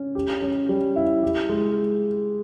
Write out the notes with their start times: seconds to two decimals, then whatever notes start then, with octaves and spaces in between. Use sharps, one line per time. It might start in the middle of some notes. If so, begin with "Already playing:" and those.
Already playing: C#4
0.15 G4
0.42 C#4
0.69 G3
0.96 E4
1.23 G4
1.49 G#3